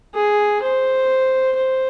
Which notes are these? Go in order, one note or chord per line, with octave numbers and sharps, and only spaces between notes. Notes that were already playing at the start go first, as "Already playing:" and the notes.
G#4
C5
C5